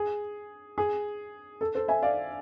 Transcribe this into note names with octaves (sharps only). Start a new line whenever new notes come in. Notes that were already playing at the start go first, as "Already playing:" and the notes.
Already playing: G#4
G#4
A4
A4 C5
E5 G#5
D5 F5